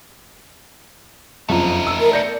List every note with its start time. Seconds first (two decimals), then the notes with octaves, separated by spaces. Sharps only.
1.49 F#1 F2 A3 D#4 F4
1.87 E6
2.00 A#4
2.13 D5 G6 A#6 C#7